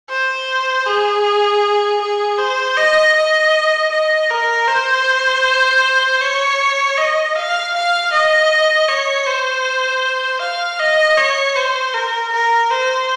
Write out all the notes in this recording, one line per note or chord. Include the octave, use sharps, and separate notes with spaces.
C5
G#4
G#4
C5
D#5
D#5
D#5
A#4
C5
C#5
D#5
F5
F5
D#5
C#5
C5
F5
D#5
C#5
C5
A#4
A#4
C5